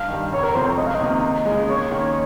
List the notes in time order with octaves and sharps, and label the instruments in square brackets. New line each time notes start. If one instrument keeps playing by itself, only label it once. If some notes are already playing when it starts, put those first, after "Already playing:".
Already playing: [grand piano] G2 [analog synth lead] F5
[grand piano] D#3 G3
[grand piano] F1 [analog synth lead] C#5
[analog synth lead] A#4
[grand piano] F2 C3 F3 C4 [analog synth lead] C5
[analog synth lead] C#5
[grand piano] C#2 [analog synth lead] D#5
[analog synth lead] F5
D#5
[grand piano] C3 D#3 A#3
D#2
G#3
C#3
[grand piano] D#2 [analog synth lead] C#5
[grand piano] D#3 A#3 C#4